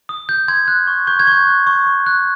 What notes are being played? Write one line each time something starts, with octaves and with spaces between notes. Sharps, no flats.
D#6
G6
C6 G#6
F#6
C#6
C#6 G6
G#6
C#6 G6
F#6
C#6
C#6
F#6